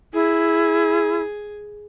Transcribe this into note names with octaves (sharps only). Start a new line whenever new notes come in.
E4 G#4